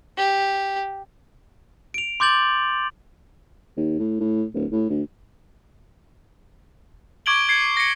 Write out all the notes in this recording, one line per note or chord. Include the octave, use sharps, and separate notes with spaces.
G4
D7 F7
C6 D6 G6 A6 F#7
D#2
A2
A2
D1
A2
D2
C#6 D6 G#6 D7 F#7 G7
G#6 C7 C#7
A#6 C#7